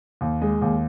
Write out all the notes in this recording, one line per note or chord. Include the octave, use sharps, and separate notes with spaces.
D#2
G#3
D#2